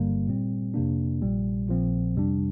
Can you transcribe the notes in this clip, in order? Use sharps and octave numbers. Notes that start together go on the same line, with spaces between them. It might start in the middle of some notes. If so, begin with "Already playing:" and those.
Already playing: G1 G2 D3 G3 A#3
A#2 G3 C4
F2 C3 A#3 D4
A#1 A#2 G3
A#1 A#2 F3 C4
F2 C3 G3 D4